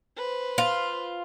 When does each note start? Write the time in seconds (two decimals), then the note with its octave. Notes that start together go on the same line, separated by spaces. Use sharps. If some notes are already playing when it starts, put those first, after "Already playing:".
0.18 B4 C5
0.58 F4